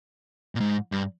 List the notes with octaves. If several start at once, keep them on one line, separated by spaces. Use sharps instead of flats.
A#2
G#2
G2